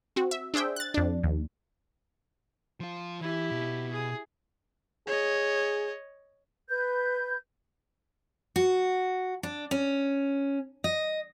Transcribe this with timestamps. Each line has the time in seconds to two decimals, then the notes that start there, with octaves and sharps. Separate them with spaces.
0.16 C4 F#4
0.31 E5
0.54 D4 G#4 C5 E5 G5
0.76 F#6 A6
0.94 F2 D4
1.23 D#2
2.80 F3 F4
3.21 E3 E4 G4
3.51 B2
3.92 G#4
5.07 G#4 C#5 D#5
6.69 B4 G6
8.56 F#4
9.43 D4
9.71 C#4
10.84 D#5